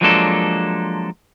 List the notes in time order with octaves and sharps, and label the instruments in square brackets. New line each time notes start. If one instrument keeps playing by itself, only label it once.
[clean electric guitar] F3 F#3 G#3 A#3 D4 A4